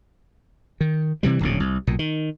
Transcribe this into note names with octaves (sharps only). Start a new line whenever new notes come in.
D#3
C3 E3 G3
D1 A#1 C#3
C2
B1 A#2
D#3